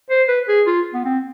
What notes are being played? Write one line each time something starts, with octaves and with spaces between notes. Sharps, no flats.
C5
B4
G#4
F4
B3
C4